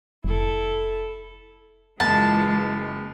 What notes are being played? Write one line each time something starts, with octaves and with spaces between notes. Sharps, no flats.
F1 E4 A4
F#1 E3 G#3 F4 A5